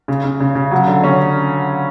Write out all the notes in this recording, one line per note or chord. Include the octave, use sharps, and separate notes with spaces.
C#3
C#3
C#3
C#3
F#3
D3
C#4